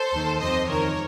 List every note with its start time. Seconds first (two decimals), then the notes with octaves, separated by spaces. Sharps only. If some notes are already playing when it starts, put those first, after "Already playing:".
Already playing: A4 C5
0.12 D#2 D#3
0.39 F2 C3 F3 C5 D#5
0.68 C#2 C3 D#3 A#4 C#5